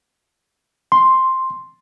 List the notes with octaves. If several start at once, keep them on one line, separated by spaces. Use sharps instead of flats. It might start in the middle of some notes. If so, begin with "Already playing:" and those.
C6